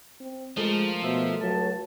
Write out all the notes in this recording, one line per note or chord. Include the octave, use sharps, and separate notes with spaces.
C4
F3 G#3 A3 A4 A#4
B2 C5 E5
C#2 F#3 A5